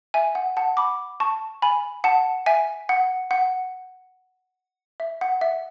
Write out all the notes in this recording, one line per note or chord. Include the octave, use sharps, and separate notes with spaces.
E5 G#5
F#5
F#5 A5
B5 D6
A5 C#6
G#5 B5
F#5 A5
E5 G#5
F#5
F#5
E5
F#5
E5